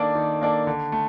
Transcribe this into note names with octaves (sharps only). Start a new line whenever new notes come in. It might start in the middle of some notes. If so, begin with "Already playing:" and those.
Already playing: D#3 A#3 D4 A4 D5
D#3
A#3 D4 A4 D5
D3
A3